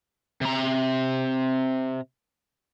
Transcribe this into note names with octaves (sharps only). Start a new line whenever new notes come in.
C3 A#5